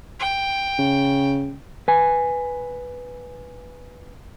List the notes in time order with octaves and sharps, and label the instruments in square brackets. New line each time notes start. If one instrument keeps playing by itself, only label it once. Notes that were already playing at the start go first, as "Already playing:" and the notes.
[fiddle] G5
[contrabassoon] C#3
[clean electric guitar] B4 G#5